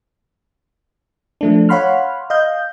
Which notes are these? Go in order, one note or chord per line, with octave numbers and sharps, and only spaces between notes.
F3 A3 D4
C#5 F5 F#5 B5 C6 F6
D#5 F5 G6